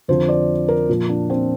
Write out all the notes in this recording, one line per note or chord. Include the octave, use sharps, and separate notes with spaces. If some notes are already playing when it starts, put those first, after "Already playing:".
F2 D3 F3 C5
D5
A#4
A#2 F3
D4
C4